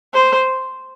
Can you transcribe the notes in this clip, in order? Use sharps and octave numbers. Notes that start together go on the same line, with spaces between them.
C5